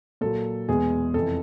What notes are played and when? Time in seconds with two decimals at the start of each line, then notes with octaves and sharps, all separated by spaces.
0.21 A#2 F#3 A4
0.68 E2 B2 G#3 G#4
1.14 F2 C3 E3 A4